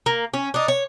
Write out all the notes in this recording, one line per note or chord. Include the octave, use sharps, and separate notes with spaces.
A#3
C#4
D4 D#4
C#5